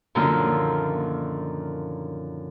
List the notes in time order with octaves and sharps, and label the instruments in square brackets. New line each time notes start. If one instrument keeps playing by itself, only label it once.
[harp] F#2 A#2 D3 D#3 F3 E6